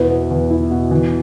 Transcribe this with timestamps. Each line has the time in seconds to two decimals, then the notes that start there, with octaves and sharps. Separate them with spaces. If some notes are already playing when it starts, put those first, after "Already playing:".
Already playing: E2 B2 E4 B4
0.11 B3
0.31 E2
0.50 E4
0.71 B2
0.91 E3